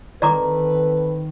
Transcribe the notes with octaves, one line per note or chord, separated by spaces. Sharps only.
D#3 C4 A4 B4 D5 A#5 D6